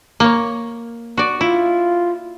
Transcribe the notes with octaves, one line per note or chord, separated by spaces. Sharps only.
A#3 C#5
F#4 D5
E4 F4